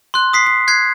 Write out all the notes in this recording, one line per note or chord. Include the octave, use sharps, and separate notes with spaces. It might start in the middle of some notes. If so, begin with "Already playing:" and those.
C6 F#6
D#6 B6 C7
C7
F#6 G#6 C7